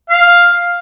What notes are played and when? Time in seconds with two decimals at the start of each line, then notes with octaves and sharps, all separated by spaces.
0.09 F5